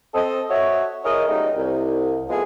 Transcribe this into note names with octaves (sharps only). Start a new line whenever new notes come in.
C4 A4 D#5
F#4 C#5 E5
E4 G#4 A#4 C#5 D#5
C#2 F#3 G3 A3 D#4
C2
F3 G#3 A3 B3 F#4 G#4